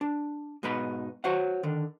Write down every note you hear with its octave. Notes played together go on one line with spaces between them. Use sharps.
D4
G#2 B2 B3 D#4 B5
F#4 C5 C#5 F#5
D3 D#3